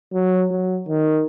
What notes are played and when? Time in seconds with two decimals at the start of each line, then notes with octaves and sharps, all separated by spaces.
0.14 F#3
0.51 F#3
0.89 D#3